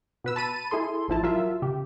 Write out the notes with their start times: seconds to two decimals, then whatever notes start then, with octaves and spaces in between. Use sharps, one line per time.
0.24 B2 B4 E6
0.36 A5 B5 D#7
0.71 E4 G#4 A4 C6
1.08 A1 F3 E4 A5
1.23 F#3 F4 A#4 E5
1.62 C#3 G4